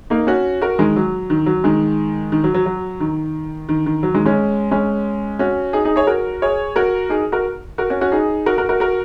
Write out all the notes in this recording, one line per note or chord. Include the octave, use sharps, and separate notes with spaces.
A#3 D#4
C#4 F#4
F#4 A#4
D#3 G#3
F#3
D#3
F#3
D#3 G#3
D#3
F#3
F#3
F#3
D#3
D#3
D#3
F#3
D#3 G#3
G#3 C#4
G#3 C#4
C#4 F#4
D#4 G#4
D#4 G#4
G#4 C#5
F#4 A#4
G#4 C#5
F#4 A#4
D#4 G#4
F#4 A#4
F#4 A#4
C#4 F#4
C#4 F#4
D#4 G#4
F#4 A#4
F#4 A#4
F#4 A#4
F#4 A#4